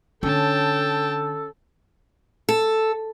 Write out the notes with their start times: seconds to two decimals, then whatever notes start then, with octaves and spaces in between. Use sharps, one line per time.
0.23 D3 C#4 A4 G5 A5
2.49 A4